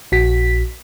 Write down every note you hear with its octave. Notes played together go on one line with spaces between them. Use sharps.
A#1 F#4 B6